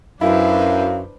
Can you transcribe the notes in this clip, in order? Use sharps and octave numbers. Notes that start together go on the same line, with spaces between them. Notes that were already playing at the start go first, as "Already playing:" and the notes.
F#2 D4 E4 B4 C5 F5